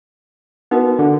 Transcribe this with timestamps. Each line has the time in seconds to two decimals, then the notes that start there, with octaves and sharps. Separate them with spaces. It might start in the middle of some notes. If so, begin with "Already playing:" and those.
0.71 B3 D#4 F#4 A#4
0.99 D3